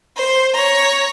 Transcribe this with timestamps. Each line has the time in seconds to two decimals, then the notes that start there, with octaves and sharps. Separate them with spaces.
0.17 C5
0.54 C#5 A#5